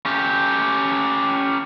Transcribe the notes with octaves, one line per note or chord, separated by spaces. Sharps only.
C#4 G4